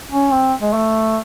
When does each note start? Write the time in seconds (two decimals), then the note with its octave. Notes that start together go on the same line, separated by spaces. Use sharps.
0.10 C#4
0.31 C4
0.62 G#3
0.74 A3